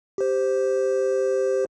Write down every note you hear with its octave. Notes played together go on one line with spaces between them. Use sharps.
G4 C5